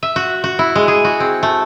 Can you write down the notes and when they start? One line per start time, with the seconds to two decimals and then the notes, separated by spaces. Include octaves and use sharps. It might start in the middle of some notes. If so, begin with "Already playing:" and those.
0.03 E5
0.16 F#4
0.44 F#4
0.59 E4
0.75 G#3
0.88 G#4
1.04 F#4
1.20 C4
1.43 A3